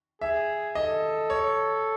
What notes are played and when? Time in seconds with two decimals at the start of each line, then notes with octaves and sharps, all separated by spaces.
0.21 G#4 E5
0.75 A4 D#5
1.30 C#5